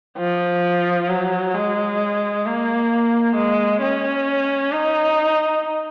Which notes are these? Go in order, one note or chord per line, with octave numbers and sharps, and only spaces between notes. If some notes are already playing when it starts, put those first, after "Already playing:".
F3
F#3
G#3
A#3
G#3
C#4
D#4